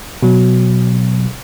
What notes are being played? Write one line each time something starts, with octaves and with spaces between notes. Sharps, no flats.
B2 F#3